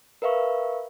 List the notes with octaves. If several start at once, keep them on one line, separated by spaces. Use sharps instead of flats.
A#4 B4 E5 F5 C#6